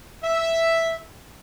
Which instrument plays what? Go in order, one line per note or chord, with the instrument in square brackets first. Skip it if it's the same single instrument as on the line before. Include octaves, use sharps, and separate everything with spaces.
[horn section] E5